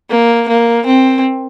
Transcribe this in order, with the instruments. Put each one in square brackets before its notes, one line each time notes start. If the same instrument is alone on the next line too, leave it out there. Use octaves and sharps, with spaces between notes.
[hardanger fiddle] A#3
A#3
C4